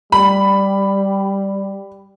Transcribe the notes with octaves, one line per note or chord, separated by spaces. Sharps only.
G3 B5